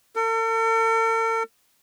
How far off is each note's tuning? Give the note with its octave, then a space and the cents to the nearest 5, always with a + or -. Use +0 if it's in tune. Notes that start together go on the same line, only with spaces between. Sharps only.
A4 +45